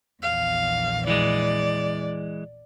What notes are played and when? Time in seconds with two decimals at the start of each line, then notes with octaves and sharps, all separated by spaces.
0.23 A#1 E2 F5
1.07 E3 G#3 D5